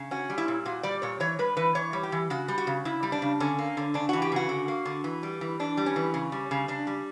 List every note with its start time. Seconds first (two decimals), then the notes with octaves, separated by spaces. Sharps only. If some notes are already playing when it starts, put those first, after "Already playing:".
Already playing: C#3
0.11 C#4 F#4
0.30 G3
0.38 E4
0.48 A#2
0.65 A#2 F#4
0.83 G3 D5
1.02 A#2 C#5
1.20 E3 C#5
1.39 G3 B4
1.57 E3 B4
1.75 E3 C#5
1.93 G3
2.03 G4
2.12 E3
2.30 C#3 F#4
2.48 G3
2.58 F#4
2.67 C#3
2.85 C#3 E4
3.03 G3
3.12 D4
3.22 C#3
3.40 D3 C#4
3.59 A#3
3.77 D3
3.94 C#3 D4
4.09 E3 F#4
4.22 G4
4.32 C#3 F#4
4.49 D3
4.68 A#3
4.85 D3
5.04 E3
5.23 G3
5.41 E3
5.59 E3 D4
5.77 G3
5.86 C#4
5.96 E3
6.14 C#3
6.32 G3
6.51 C#3
6.68 C#3 D4
6.87 G3